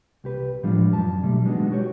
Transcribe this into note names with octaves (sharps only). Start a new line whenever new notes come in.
C2 G4 B4
A2 F3 G3 G#3 D4 F4
F#2 F#3 A5
B2 D3 F#3 G3 A3
G3 G#3 B3 D4 D#4 F#4
F#4 G4 C#5